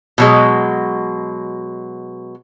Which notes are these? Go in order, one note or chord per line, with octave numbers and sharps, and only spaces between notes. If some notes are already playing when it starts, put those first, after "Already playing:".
B2 F#3 G#3